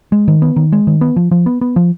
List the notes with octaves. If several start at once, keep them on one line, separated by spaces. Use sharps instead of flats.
G#3
D#3
B3
D#3
G#3
D#3
B3
F3
F3
B3
B3
F3